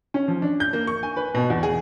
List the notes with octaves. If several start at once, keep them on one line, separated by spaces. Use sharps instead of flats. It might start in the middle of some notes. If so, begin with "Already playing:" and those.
C#4
F3
D4
G6
A#3
C#6
G#5
B4
B2
E2
G#4